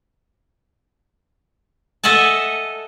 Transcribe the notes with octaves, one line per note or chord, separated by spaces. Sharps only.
A4 D#5 E5 F#5 G#5 A5